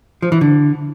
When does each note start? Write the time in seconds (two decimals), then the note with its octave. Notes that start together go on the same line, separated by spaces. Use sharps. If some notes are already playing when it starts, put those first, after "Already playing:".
0.22 F3
0.32 E3
0.41 D3